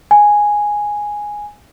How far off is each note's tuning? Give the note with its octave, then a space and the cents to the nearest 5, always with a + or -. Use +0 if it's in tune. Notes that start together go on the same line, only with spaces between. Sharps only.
G#5 +0